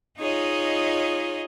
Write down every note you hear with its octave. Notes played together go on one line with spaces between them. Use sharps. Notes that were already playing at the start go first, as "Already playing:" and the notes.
D#4 F4 G#4 C#5 D#5